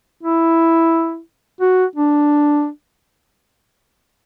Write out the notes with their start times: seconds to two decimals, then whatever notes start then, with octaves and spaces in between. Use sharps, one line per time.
0.23 E4
1.61 F#4
1.95 D4